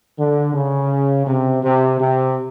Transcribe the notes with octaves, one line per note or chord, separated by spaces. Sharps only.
D3
C#3
C3
C3
C3